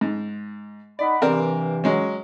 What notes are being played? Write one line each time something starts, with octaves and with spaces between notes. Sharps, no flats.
G#2
D#4 D5 F#5 B5
G2 C3 E3 C4 A#4 D5
F#3 G#3 C#4